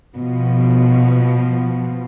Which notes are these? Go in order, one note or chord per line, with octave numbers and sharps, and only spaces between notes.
B2 F3